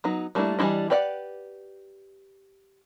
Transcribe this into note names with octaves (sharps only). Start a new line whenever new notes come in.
F#3 B3 D#4
G3 A3 A#3 D4 E4
E3 G3 D4 E4 D#5
G4 B4 D5 E5 F#5